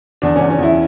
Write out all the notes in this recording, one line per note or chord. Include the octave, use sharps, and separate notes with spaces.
E2 D4
C#4
E2
C#4
E2 E4